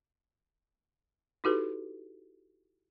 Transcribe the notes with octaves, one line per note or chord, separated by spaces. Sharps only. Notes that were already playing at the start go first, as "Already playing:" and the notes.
D#4 E4 F#4 G4 A4 B4